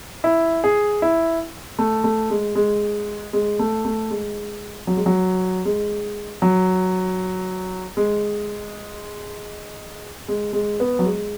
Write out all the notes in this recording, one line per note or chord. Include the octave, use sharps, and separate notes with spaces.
E4
G#4
E4
A3
A3
G#3
G#3
G#3
A3
A3
G#3
F#3
G#3
F#3
G#3
F#3
G#3
G#3
G#3
B3
F#3
G#3